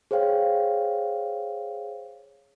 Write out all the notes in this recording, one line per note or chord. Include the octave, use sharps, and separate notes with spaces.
G#4 C5 C#5 F5 G5